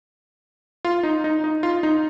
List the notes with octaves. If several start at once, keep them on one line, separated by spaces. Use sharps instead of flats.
F4
D#4
D#4
D#4
F4
D#4